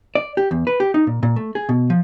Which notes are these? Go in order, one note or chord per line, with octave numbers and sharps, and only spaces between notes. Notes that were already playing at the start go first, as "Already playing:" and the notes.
D5
G4
E2
B4
G4
D#4
A#2
A#2
A3
G#4
B2
F3